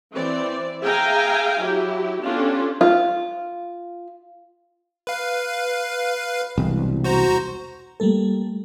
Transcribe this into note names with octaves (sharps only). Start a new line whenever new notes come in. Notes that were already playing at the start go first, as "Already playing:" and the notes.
E3 C4 D5
G#4 E5 F5 G5 G#5 A#5
F#3 E4 G4
B3 C#4 D4 F4 G4 A4
F4
B4 F5
E1 C2
F#4 C5 A#5
G3 A3 A#3 A4